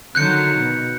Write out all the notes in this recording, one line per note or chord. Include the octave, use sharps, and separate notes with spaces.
D3 D#3 F#3 F#6 G6 C#7
B2